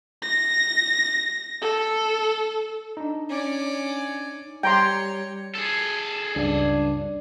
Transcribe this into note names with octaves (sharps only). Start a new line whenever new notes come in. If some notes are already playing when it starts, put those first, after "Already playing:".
A#6
A4
D4 D#4
C#4 D5
G3 G4 C#5 G5 A#5 C6
G#4 A4
C#2 G2 D4